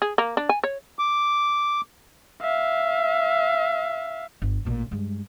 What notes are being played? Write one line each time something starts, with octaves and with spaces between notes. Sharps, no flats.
G#4
A#3
D4
G#5
C#5
D6
E5 F5
G1
A1 A#2
G2 G#3